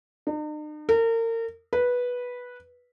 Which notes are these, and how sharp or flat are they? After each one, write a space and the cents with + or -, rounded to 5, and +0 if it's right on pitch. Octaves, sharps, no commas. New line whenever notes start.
D#4 -45
A#4 -35
B4 -10